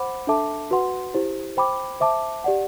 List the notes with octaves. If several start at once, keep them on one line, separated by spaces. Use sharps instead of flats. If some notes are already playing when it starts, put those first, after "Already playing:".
Already playing: C5 F#5 B5 D6
D4 A4 E5 A5 D6
F#4 B4 F#5 C6
E4 G4 C5
C5 G5 B5 D6
C5 E5 A5 D6
G4 D5 F#5